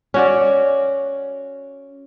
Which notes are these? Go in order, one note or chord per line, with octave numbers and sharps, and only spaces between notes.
C#4 F#4 D5